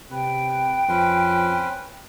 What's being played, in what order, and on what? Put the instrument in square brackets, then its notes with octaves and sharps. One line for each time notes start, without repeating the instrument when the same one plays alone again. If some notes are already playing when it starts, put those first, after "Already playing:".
[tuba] C3 [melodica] B4 [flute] G5
[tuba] F2 [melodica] C#4 B4 C5